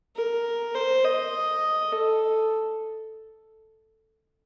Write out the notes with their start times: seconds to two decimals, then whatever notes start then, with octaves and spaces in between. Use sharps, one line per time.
0.16 A#4
0.75 C5
1.04 D#5
1.92 A4